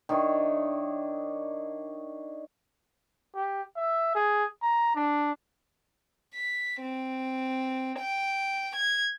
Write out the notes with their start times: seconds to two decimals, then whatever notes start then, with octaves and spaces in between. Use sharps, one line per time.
0.09 D#3 D4 E4 C#5
3.35 G4
3.77 E5
4.15 G#4
4.62 A#5
4.95 D4
6.34 B6
6.81 C4
7.99 G5
8.76 G#6